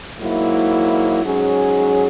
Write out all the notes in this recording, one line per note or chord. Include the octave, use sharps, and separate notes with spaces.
G#2 F#3 A#3 E4
G#2 F#3 C#4 G#4